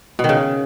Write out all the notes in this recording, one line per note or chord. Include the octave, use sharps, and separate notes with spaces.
B2
D#3
C#3